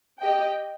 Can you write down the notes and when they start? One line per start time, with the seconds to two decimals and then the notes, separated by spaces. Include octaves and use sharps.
0.19 G4 D#5 G5